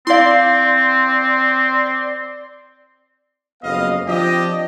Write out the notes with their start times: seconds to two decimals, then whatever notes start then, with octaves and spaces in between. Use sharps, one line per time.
0.07 C4 E4 D5 F5 C6
3.63 F#1 F2 B3 D#5 F5
4.07 F3 C4 D4 G4 D#5